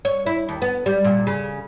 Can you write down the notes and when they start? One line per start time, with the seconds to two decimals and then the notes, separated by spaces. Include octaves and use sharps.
0.05 C#5
0.26 E4
0.49 D#2
0.62 B3
0.86 G3
1.04 A#2
1.27 C#3